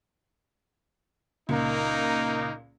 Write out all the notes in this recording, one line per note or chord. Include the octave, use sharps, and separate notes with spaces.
C#2 A#2 A#3 D#4